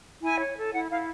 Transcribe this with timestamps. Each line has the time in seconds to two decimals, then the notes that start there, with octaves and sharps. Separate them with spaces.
0.22 E4 G#5
0.39 C#5
0.56 A4
0.73 E4 F#5
0.90 E4 F5